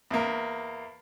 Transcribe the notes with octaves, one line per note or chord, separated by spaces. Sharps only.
E2 A#3